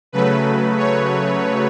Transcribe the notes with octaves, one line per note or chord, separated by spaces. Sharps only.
C#3 F#3 A3 B4
C#5